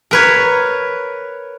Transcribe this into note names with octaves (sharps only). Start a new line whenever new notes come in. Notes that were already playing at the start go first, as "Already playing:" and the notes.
A#4 B4 C#5